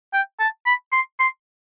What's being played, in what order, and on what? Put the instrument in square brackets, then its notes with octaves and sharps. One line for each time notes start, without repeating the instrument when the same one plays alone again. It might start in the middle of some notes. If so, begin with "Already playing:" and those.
[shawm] G5
A5
B5
C6
C6